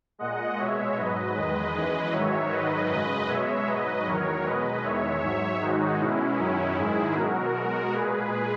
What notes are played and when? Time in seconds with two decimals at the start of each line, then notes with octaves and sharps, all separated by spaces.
0.19 A#2 G#3 D#5 F#5
0.58 B2 G#3 C#5 E5
0.96 G#2 F#3 B4 D#5
1.35 E2 D#3 G#3
1.74 F#2 E3 G#3
2.12 G#2 D#3 F#3 C#5 E5
2.51 G#2 D#3 F#3 B4 D#5
2.89 F#2 C#3 G#3 B4 D#5
3.28 B2 G#3 C#5 E5
3.67 G#2 F#3 B4 D#5
4.06 E2 D#3 F#3 A#4 C#5
4.44 B2 G#3 B4 D#5
4.83 E2 D#3 G#3 C#5 E5
5.21 G#2 F#3 C#5 E5
5.60 G#2 D#3 G#3 D#4 F#4
5.99 B2 G#3 C#4 E4
6.37 F#2 D#3 F#3 C#4 E4
6.76 G#2 D#3 G#3 E4 G#4
7.15 B2 F#3 F#4 A#4
7.54 B2 G#3
7.92 A#2 G#3 G#4 B4